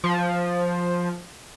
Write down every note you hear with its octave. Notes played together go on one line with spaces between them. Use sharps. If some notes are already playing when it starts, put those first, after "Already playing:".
F3